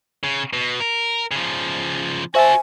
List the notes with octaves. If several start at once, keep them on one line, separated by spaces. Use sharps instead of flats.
C#3
B2
A#4
C#3 F3
F#4 C5 E5 G#5 A5